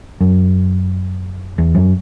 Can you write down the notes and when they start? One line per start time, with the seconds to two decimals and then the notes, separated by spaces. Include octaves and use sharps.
0.21 F#2
1.58 E2
1.75 F#2